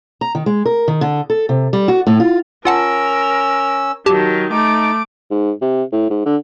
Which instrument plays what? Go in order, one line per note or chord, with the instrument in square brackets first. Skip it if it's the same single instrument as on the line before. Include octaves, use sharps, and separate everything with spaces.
[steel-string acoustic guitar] A#5
D#3
G#3
A#4
D#3
D3
A4
C3
G3
F#4
A2
F4
[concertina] C#4 E6 [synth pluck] F4 F#5 A5 [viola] A#4
[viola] D#3 F#3 [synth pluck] G4 A5
[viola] A3 D6 [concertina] D#4
[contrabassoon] G#2
C3
A2
G#2
D3